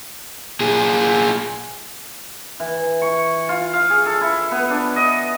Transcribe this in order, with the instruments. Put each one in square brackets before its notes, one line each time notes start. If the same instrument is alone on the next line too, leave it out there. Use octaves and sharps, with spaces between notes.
[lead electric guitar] A#2 G#4
[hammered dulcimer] E3
C#6
F4
F5
G#4
A4
E4
B3
D4
D#5